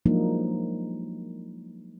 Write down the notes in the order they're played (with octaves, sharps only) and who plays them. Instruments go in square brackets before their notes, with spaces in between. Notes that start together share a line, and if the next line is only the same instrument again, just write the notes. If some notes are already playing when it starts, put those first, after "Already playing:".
[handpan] F3 F#3 G#3 A#3 D4 D#4